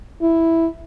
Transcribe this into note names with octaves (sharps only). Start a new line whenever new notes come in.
E4